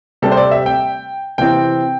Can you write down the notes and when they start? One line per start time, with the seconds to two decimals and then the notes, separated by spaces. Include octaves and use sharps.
0.22 C3 G3 C4 A4
0.32 C5
0.37 D5
0.51 E5
0.66 G5
1.38 C3 E3 C4 G5